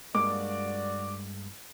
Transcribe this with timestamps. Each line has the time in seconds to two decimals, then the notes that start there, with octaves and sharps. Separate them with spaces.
0.15 G2 G#3 A#3 F#4 D5 D6